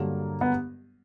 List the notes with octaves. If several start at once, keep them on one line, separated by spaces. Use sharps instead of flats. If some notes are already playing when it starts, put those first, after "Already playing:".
Already playing: G2 D3 F#3 A#3
B3